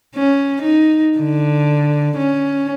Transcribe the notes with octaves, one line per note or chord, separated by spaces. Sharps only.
C#4
D#4
D3
C#4